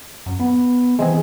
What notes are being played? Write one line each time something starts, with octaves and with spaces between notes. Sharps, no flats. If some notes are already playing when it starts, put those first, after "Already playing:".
F#2
B3
E3 G#3 C4 G#4